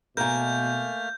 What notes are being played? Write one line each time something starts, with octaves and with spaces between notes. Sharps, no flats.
B2 A3 A#3 A#4 G#5 F6 G6